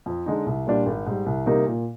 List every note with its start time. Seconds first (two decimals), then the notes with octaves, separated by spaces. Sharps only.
0.06 F2
0.26 D3 G#3 D#4
0.46 C2
0.66 A#2 G3 D4 F4
0.86 G#1
1.06 G#2 G3
1.26 C2
1.46 C3 G3 A#3 D#4
1.66 A#2